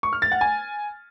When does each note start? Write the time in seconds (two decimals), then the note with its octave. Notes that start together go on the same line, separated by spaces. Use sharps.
0.03 C#6
0.13 F6
0.22 A6
0.32 F#5
0.41 G#5